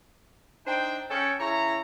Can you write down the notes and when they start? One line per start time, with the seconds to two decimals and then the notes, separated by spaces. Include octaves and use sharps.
0.67 D4 D#4 C5 G5
1.11 C#4 A4 G5
1.40 C#3 E4 C#5 A#5